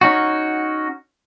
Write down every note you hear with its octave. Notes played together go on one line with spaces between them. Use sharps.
C#4 D#4 F#4